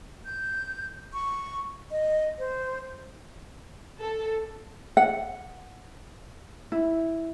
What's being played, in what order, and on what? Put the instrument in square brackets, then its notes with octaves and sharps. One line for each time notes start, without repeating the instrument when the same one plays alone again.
[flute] G6
C#6
D#5
C5
[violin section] A4
[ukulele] F#5
E4